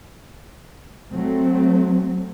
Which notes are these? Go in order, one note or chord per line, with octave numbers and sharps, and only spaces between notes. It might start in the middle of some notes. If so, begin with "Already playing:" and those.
F#3 A3 C4